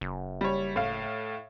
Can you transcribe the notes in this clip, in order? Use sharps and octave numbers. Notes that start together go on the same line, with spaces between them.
F#1
G3 C#5
A2 F5